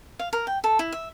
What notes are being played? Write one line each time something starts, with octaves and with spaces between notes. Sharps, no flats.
F5
A#4
G5
A4
E4
E5